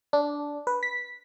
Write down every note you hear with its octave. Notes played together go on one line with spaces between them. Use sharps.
D4
B4
B6